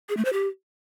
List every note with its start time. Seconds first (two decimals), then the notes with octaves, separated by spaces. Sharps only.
0.09 G#4
0.17 A3
0.25 C5
0.33 G4